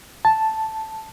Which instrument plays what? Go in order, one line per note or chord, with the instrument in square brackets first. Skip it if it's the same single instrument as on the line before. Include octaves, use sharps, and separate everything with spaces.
[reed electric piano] A5